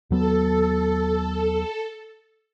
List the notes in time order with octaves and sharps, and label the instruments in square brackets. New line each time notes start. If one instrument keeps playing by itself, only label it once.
[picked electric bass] D#2 F#3 B3 [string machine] A4